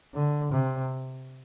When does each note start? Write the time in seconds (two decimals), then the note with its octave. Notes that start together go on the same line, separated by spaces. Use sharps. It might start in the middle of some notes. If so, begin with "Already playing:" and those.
0.14 D3
0.52 C3